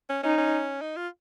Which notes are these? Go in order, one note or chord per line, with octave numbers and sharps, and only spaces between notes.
C#4
C#4 D#4
C#4
D#4
F4